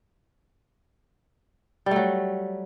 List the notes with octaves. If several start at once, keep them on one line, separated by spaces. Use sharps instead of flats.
F#3 G3 A3